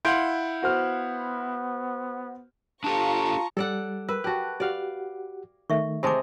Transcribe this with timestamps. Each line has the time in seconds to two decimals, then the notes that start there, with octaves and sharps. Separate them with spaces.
0.05 E4 F5 F#5 C6 G6 D7
0.63 B3 F#4 C5 F6
2.84 D4 F4 G4 A4 A5 A#5 C#6
3.57 G3 A4 D5 F#5
4.09 A#4 B4
4.24 F#4 G4 A5 F#6
4.60 F#4 G4 D5 F5 F#5
5.70 D#3 A3 E5 C#6
6.03 C3 G#3 G4 A5 D6